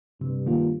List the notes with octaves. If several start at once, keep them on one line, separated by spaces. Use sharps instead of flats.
G2 C3
D#3 A#3 F4